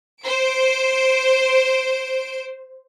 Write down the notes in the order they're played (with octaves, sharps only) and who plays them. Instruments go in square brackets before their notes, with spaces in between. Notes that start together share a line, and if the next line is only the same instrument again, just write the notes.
[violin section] C5 D7